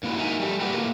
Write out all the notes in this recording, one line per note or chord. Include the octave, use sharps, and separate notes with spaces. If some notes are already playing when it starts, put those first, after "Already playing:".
G2 A#3 E4 F#4
D#4 F#4 A#4 E5 G#5 A#5
G3 A3
A#3 D4 F#4 G4 A#4 B4
A2 A#3